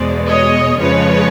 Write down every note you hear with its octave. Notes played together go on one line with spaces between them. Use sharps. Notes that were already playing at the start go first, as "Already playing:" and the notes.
Already playing: E2 B2 G#3 C5 D5
C#5 D#5
F2 C#3 F3 G#3 B4 C#5